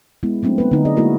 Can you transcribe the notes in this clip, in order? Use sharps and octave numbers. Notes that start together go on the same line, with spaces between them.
G#3 B3 E4
F#3 A3 C4 D4 D#4
B3 B4
D3 D#4 E4
G#4 D5 D#5
G#3 A#3 E4 F#4 A#4